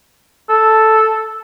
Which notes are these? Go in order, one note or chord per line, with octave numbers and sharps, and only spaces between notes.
A4